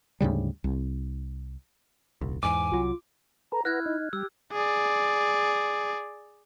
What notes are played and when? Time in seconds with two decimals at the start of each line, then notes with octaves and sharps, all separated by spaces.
0.21 D2 G#2 C#3 G3
0.64 C2
2.21 D#1 C2
2.43 E2 G#2 G#5 D6
2.72 C2 F#3 F4
3.52 A4 B4 A#5
3.65 E4 B4 F#5 A#5 F6 F#6 G#6
3.86 D#4
4.13 G3 G4 E6
4.52 G#4 D5